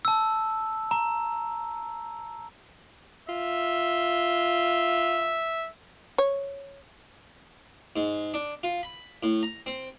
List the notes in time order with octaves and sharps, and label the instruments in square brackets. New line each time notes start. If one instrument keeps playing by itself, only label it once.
[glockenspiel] A5 E6
A#5
[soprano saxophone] F4 [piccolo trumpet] E5
[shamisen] C#5
[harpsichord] G#2
D4
F4
B5
A2
A#5
C4